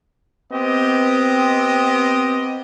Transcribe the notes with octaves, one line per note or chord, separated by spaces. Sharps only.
B3 C4 G4 D#5